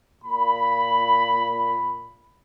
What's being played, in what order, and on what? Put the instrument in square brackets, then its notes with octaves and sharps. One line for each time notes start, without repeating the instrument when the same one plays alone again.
[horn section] A#2 B5